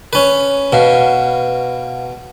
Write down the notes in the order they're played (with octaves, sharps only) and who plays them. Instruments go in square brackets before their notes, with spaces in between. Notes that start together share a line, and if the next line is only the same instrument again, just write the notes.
[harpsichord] C#4 B4
[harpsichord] B2 [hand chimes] B4 F5 F#5